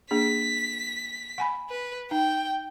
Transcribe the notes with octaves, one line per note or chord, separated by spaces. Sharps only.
A#3 D4 G#4 B6
F#5 G#5 B5
B4
D#4 G5